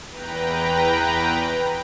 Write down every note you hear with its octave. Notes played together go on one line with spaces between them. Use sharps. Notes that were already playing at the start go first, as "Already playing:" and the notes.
E2 B4 G5 A#5